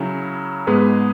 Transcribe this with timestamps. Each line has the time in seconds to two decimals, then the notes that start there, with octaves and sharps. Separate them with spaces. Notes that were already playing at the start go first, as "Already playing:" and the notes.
Already playing: C#3 F#3 C#4 E4
0.67 G#2 G#3 B3 G#4 B4